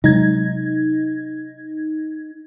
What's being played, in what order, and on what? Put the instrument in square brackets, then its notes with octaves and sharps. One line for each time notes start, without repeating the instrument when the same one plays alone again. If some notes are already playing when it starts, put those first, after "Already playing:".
[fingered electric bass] C3 F#3 G#3 [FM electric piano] D#4 G#6